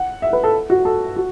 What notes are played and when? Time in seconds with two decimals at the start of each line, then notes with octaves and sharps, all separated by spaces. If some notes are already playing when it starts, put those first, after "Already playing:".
Already playing: F#5
0.22 E5
0.33 B4
0.44 A4
0.70 F#4
0.85 A4
1.16 F#4